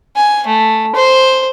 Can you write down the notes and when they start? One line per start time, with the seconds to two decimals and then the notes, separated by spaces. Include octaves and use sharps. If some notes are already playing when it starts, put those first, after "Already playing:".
0.17 G#5
0.47 A3
0.96 C5